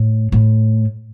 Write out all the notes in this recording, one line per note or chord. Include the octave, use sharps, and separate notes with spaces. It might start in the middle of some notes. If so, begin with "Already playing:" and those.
Already playing: A2
A2